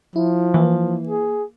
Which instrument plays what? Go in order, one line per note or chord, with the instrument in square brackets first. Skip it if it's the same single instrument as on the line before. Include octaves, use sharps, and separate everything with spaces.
[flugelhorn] F3 [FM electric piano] E4
[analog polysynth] E3 [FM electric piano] A#3
[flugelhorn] G#4